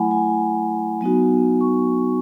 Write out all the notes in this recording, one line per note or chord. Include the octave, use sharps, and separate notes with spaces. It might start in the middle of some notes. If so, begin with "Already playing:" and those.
Already playing: F#3 A3 E4 F#5 G#5 B5
G#5
F#3 B3 D#4 F#4
C#6